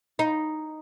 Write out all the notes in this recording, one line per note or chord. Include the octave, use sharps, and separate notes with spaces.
D#4